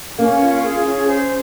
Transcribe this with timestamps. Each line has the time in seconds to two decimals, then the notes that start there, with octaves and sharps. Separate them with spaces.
0.18 A#3 C#4
0.40 F4
0.64 G#4
0.85 C#4
1.08 C5